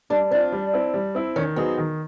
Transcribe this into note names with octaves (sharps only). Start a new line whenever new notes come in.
G3 D4
C4 D4 F4
G3
C4 E4
G3
C4 E4
D#3 C#4
F#3 B3 C4 D#4 G#4
D#3